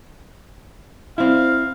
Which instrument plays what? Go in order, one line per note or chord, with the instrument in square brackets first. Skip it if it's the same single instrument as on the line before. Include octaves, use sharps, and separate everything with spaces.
[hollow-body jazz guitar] C4 E4 [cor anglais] F5